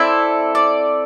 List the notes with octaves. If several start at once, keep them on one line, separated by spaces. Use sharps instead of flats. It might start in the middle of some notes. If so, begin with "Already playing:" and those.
Already playing: C4 E4 A4 D5
D5